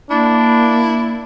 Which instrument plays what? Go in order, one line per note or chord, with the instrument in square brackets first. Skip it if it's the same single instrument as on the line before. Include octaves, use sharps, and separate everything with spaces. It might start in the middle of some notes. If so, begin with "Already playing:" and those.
[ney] A#3 [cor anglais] D4 [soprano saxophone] E4